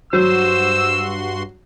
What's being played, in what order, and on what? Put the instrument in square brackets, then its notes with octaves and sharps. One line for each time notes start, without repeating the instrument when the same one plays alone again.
[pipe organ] G2 F#4 C6 [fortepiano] F#3 [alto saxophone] C5 [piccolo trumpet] E6